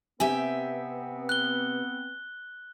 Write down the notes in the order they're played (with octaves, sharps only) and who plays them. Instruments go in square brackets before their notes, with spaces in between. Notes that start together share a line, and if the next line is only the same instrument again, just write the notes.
[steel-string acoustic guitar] C3 G4 E5 [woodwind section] B3 C4 [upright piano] G#5
[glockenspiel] F#6 G7